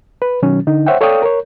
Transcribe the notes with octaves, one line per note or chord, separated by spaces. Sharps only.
B4
B2 D#3 F#3 C#4
D3 D#4
C5 C#5 E5 F#5 G5
A4 C#5 D5 F5 G5 D#6
A#4 C#5